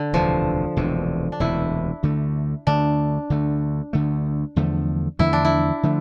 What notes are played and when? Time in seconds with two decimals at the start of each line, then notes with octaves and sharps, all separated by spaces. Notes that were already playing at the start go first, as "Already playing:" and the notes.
Already playing: D3
0.13 E1 D2 C3 E3 F3
0.77 E1 D2 C3 E3
1.32 D4
1.40 E1 D2 C3 E3 E4
2.03 D2 D3 A3
2.67 D2 D3 A3 D4
3.30 D2 D3 A3
3.93 D2 D3 A3
4.56 E2 D3 F3 A3
5.19 E2 D3 F3 A3 E4
5.33 D4
5.45 E4
5.83 D3 F3 A3